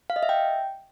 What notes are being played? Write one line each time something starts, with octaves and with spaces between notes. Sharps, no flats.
F5
D#5
E5
G5